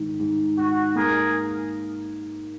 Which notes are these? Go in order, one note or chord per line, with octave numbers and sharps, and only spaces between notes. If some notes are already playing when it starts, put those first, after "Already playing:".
Already playing: G#2 D#3
G#2
G#2 F#4
A#3 G#4 A#4